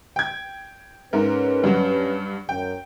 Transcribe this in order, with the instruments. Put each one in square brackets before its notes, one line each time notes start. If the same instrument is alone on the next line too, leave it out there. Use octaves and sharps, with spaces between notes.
[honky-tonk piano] G5 G#6
[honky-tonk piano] G#2 A#4 [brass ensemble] C#4 B4
[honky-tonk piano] G2 F#3
[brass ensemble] F#2 [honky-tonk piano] G5